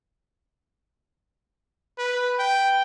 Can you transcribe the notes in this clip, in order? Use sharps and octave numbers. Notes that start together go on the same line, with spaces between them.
B4
G5